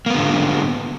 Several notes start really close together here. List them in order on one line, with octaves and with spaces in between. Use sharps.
A#3 B3 D3 G#2